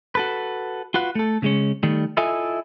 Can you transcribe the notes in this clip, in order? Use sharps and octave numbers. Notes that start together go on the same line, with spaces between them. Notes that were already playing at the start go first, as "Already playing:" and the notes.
F#4 A4 B4
F4 F#4 B4 F#5
A3 A4
C#3 G#3 C#4
D#3 G3 A3
E4 F4 A4 D#5 E5 G#5